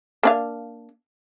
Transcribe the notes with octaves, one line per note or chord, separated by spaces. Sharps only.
A#3 D4 F5